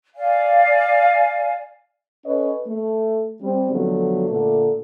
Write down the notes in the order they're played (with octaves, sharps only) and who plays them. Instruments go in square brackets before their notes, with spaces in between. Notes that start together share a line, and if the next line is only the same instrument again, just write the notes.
[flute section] D5 F5 G#5
[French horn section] C#4 A4 B4 C#5 D#5
A3
G3 C4
D3 F3 F#3 A3 B3
A#2 D3 A3 A4